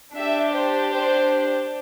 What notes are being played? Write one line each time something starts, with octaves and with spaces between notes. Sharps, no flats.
D4 G4 E5
C5
C5